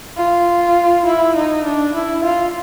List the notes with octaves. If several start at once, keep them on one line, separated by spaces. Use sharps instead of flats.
F4
E4
D#4
D4
E4
F4